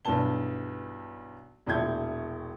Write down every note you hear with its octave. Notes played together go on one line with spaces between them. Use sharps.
B1 G2 E3 B3 A5 G7
E1 A#1 E3 A3 G6 G#6